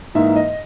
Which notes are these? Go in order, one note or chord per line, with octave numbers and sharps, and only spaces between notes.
G#2 E3 A#3 D#4 E5
D#5